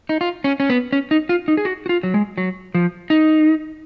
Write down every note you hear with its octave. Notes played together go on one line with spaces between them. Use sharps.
D#4
F4
C#4
C#4
B3
C#4
D#4
F4
D#4
G#4
F#4
F#4
F4
F#3
G#3
F#3
F3
D#4